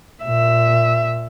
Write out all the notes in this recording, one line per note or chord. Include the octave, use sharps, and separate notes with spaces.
A#2 E5